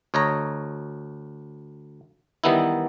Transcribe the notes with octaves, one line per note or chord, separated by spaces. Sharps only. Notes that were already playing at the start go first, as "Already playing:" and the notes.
D2 C#5 D#5 A#5
D#3 E3 G3 B3 D#4 E4